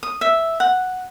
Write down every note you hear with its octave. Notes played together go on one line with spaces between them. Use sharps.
D#6
E5
F#5